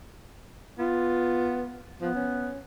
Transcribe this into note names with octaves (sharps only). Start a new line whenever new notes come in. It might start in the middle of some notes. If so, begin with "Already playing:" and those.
B3 F4
F3 B3
C#4